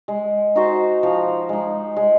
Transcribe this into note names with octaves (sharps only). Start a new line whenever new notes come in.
G#3
D#4 F#4 C5
F3
G#3 D#4
G#3